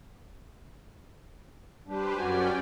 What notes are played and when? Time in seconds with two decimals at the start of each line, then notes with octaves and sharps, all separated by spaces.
1.87 G3 D4 G4 B4 C5
2.18 F#2 C#4 F#4 D5 G5 G#5